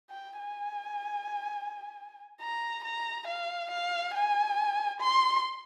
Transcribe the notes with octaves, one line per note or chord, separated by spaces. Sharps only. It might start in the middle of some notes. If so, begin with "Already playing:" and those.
G5
G#5
A#5
A#5
F5
F5
G#5
C6